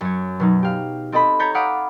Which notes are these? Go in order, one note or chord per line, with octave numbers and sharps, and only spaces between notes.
F#2 C#5
B2 F#3 D#4
G4 F5
C4 A4 D#5 A5 B5
C#5 A#5 G6 A6 B6
F5 F#5 B5 D6 D#6 D7